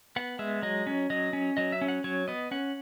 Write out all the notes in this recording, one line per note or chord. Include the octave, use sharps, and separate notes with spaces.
B3 F#5
G#3 E5
F#3 D#5
C#4
F#3 D#5
C#4
F#3 D#5
E5
C#4
F#5
F#3 C#5
B3 D#5
C#4 F#5